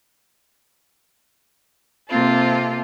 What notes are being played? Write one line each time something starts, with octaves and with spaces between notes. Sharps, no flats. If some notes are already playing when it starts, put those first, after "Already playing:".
C3 A#3 C4 F4 A4